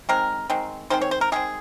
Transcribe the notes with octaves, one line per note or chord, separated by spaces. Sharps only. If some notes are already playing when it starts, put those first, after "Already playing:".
D#3 G#3 C4 A#4
D#3 G#3 C4
D#3 G#3 C4 C5
C#5
C5
A#4
D#3 G#3 C4 G#4